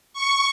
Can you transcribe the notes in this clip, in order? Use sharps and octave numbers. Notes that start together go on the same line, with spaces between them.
C#6